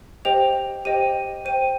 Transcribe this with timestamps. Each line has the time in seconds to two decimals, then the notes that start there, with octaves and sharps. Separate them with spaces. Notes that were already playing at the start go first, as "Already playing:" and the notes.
0.25 G4 C5 D#5 G5 F7
0.85 G4 C5 D#5 G5 D#7
1.45 C5 G5 D#7